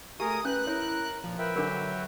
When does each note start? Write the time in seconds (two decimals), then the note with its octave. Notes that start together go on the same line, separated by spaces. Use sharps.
0.20 A3 G4 G#4 A#4 D#6
0.45 C#4 B4 F#6 G6
0.67 E4 A#4 C#5
1.24 A#2 F3
1.38 A#4 B4 E5 G5
1.56 D3 F#3 D4 G#4 A#4